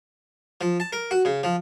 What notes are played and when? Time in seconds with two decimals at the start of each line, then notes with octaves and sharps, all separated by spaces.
0.61 F3
0.80 A5
0.93 A#4
1.11 F#4
1.25 C#3
1.43 F3